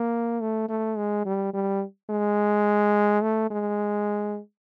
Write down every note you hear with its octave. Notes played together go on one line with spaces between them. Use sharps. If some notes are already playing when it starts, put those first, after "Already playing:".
Already playing: A#3
A3
A3
G#3
G3
G3
G#3
A3
G#3